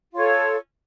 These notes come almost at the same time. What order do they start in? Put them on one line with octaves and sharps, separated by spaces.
F4 C#5 A4